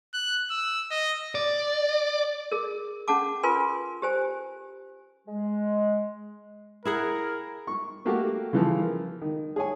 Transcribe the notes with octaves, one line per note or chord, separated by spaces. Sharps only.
F#6
E6
D#5
D5
G#4 A#4
C#4 G#4 F#5 A5 D6
F4 A#4 B4 G#5 C6
G4 C5 G#5
G#3
E4 G#4 A#4 F#5
C#6
A3 A#3 F#4 G4 A#4
C#3 E3 F3
A#4
D#3
G#4 C#5 G#5